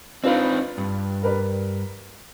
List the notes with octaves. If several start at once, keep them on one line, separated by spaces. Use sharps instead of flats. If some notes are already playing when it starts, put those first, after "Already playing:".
C4 D4 D#4 F4 B4
G2
A#4 B4 D5